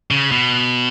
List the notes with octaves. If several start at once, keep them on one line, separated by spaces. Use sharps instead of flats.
C#3
B2